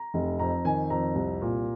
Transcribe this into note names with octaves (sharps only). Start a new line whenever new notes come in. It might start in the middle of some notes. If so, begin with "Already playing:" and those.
Already playing: A#5
F1
F2 A#5
D#3 G#5
F2 A#5
C2
A#2